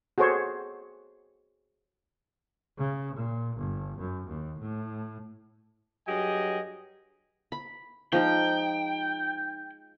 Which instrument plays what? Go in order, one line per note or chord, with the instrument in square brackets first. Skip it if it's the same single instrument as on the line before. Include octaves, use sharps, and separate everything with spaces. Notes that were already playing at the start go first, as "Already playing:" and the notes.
[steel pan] F#4 G#4 A4 C5 C#5
[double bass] C#3
A#2
G1
F#2
D#2
A2
[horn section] G2 F#3 G4 G#4 D#5 G#5
[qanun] B5
[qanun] F3 G#3 D#4 [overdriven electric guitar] G5